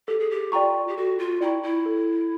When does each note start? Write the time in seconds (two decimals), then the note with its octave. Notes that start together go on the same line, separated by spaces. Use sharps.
0.08 G4 A4
0.20 G#4
0.31 G4
0.52 F4 D5 G5 A#5 C#6
0.87 G4
0.97 F#4 A4
1.19 F4
1.41 E4 D5 G5 A#5 C#6
1.63 E4
1.86 A4